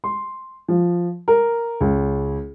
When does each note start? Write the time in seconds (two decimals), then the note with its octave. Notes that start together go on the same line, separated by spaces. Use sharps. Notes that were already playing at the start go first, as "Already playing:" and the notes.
0.04 C6
0.68 F3
1.28 A#4
1.81 C#2